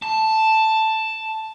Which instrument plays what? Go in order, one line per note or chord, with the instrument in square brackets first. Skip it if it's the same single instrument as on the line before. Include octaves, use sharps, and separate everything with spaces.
[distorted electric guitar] A5